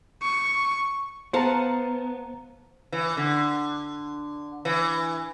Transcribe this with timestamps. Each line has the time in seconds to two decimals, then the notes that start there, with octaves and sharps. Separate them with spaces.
0.22 C#6
1.33 B3 C5 F5 F#5 A5 A#5
2.92 E3
3.17 D3
4.65 E3